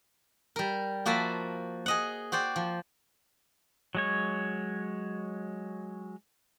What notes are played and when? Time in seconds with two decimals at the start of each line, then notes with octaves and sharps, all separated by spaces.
0.56 G3 A#4
1.06 F3 A#3 F#4 E5 A5 B5
1.86 G#4 D#5 F#5
2.32 F#4 C5 D5 G5
2.56 F3
3.95 F#3 G#3 C#5